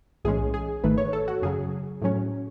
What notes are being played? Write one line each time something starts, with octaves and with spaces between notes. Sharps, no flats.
B1 A2 E3 G#3 C#4 G#4
G#4
G#1 G#2 D#3 A3 B4
C#5
A4
F#4
F#2 C#3 F#3 G#4
A2 F#3 C#4